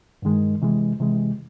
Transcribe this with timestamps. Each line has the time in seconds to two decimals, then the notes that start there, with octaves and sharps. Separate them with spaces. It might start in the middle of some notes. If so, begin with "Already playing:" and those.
0.22 G2 D#3 G#3
0.62 C3 E3 G#3
1.00 C3 E3 G#3